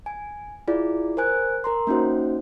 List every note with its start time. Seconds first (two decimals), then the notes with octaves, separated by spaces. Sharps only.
0.06 G#5
0.68 E4 F4 G#4 D5
1.17 A#4 C5 G#5 F#6
1.64 A#4 A#5 C6
1.87 A#3 C#4 D#4 F#4 C5